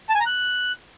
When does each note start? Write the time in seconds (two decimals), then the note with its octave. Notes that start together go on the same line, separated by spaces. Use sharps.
0.09 A5
0.15 G#5
0.21 A#5
0.26 F#6